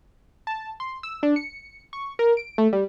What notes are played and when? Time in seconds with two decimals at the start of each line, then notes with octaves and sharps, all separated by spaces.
0.47 A5
0.80 C6
1.03 E6
1.23 D4
1.36 C#7
1.93 C#6
2.19 A#4
2.37 D7
2.58 A3
2.73 G3